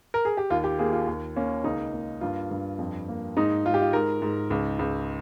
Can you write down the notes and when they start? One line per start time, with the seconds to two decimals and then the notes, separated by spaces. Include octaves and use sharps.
0.14 A#4
0.25 G#4
0.37 G4
0.50 D#2 F4
0.64 G4
0.79 A#3 G#4
0.93 F4
1.07 D#2
1.36 A#3 C#4
1.64 C#2 D#4
1.93 A#3
2.21 G2 F4
2.51 G2
2.79 F2
3.08 A#3
3.37 G#2 D#4
3.65 G#2 F4
3.74 G4
3.82 F4
3.93 G#2 A#4
4.22 G#2
4.50 C#2
4.79 C#2